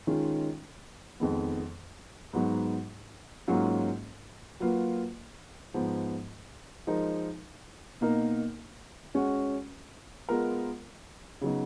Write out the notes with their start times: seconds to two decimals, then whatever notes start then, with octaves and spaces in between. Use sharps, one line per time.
0.07 D#3 G#3 C#4 F4
1.20 F2 D#3 G#3 B3
2.33 G#2 F#3 B3 D#4
3.48 G#2 F#3 A#3 C#4 F4
4.60 F#3 A#3 F4 B4
5.74 G#2 F3 B3
6.87 F3 G#3 D#4 A#4
8.01 B2 A#3 D#4 A#4
9.14 G#3 C#4 F#4
10.29 G#3 B3 F4 A#4
11.41 C#3 F#3 B3 D#4